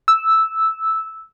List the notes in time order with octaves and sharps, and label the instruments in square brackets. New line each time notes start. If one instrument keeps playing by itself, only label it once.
[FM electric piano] E6